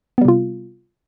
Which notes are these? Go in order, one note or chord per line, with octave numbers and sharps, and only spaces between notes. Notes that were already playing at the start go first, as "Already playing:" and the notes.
C3 G3 B3 F4